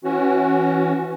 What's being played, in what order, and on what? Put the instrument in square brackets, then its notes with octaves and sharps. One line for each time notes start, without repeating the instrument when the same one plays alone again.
[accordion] E3 C#4 F#4